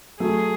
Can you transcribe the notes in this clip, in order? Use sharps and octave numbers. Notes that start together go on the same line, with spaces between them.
F#3 A3 G#4